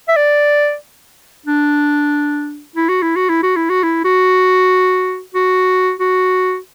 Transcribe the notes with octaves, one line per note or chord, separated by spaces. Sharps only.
E5
D5
D4
E4
F#4
E4
F#4
E4
F#4
E4
F#4
E4
F#4
F#4
F#4